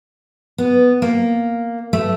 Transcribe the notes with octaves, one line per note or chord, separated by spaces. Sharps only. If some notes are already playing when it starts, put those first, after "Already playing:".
B3
A#3
A3